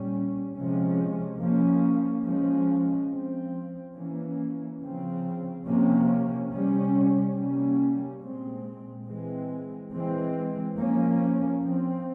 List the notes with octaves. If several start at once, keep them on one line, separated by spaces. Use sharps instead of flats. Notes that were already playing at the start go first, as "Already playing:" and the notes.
Already playing: A#2 G3 C#4
C3 F3 G#3 C#4
F3 A#3 C#4
F3 G#3 C#4
F3 C4
E3 A#3 C#4
C#3 F3 C4
C3 F3 A#3 C#4
C3 G3 C#4
C3 G3 A#3 C#4
A#2 G#3 C4
E3 G#3 C4
E3 G#3 C4
F3 A#3 C#4
F3 C4